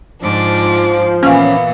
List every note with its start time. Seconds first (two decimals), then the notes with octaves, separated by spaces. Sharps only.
0.22 G#2 F3 D4 D6
1.23 A#2 E3 A#3 B3 C#4 F5